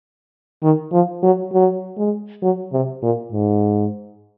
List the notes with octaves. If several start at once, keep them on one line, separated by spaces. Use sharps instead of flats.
D#3
F3
F#3
F#3
G#3
F#3
C3
A#2
G#2